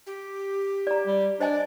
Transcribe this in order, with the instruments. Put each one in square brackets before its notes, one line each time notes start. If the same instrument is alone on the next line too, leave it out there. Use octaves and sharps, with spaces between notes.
[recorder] G4
[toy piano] D5 A#5
[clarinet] G3
[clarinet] D4 [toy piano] C5 D#5 G#5 [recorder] D5